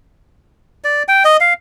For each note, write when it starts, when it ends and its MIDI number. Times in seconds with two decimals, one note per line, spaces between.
0.84 1.03 74
1.08 1.23 79
1.25 1.37 75
1.40 1.54 77